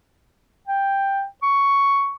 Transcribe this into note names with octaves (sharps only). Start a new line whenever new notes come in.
G5
C#6